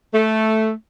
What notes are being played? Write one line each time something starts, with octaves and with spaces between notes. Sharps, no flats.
A3